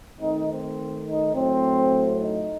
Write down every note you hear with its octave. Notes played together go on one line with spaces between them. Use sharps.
D#3 A3 C4 D#4
C4
D#4
A2 F#3 A3 C4
D#4